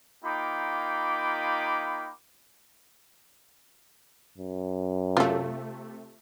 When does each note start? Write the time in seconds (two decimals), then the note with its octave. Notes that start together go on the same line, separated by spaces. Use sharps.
0.25 A#3 D#4 F4 G5 B5 D6
4.38 F#2
5.17 C3 A3 F4 A4